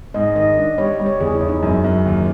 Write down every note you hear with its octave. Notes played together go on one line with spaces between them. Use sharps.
G#2 D#5
D#3 D#5
D4
G3 C#5
G3
C#5
E2 G#4
E4
E2
D#4
F#2
F#2
D#2